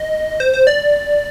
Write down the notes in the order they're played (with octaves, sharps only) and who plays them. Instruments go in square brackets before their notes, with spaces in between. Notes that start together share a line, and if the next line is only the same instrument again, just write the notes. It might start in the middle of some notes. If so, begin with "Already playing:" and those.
Already playing: [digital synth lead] D#5
C5
C5
D5